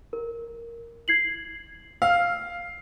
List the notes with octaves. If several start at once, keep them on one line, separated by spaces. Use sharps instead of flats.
A#4
G#6 C7 F#7
F5 E6 F6